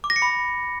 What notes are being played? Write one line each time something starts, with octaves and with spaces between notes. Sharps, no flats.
D6
A#6
C#7
B5